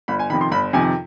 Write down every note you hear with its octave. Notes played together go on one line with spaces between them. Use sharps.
G1 B5
G#5
F2 C3 D#3 B5
C6
G1 B5
F2 C3 D#3 G#5